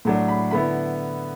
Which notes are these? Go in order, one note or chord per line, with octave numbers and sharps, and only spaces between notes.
A2 F#3 A3 D4
B5
D3 B3 E4 B5